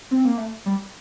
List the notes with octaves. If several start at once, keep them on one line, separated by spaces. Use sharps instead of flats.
C4
A#3
A3
G3